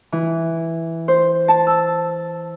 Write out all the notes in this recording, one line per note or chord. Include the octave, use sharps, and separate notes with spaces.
E3
C5
A5
E6